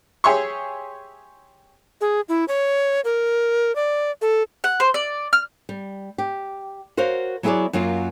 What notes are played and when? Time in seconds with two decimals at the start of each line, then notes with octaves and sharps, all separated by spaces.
0.24 G4 G#4 C#5 E5 C6 C#6
2.01 G#4
2.29 E4
2.48 C#5
3.05 A#4
3.76 D5
4.22 A4
4.64 F#5
4.80 C5
4.94 D5
5.33 F6
5.69 G3
6.18 G4
6.97 F#4 A#4 C5 C#5 F5
7.43 F#3 B3 E4 G#4 C#5 D5
7.73 F#2 F#3 A#3 F4